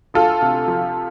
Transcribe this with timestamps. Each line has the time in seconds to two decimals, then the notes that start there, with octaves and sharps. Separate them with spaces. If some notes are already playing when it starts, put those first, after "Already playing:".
0.14 D2 F4 A4
0.42 C3
0.67 F3